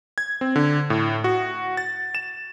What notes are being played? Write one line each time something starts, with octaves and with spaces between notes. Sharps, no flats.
G#6
C4
D3
A2
F#4
A6
E7